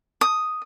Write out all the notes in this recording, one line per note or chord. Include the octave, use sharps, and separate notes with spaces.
D#6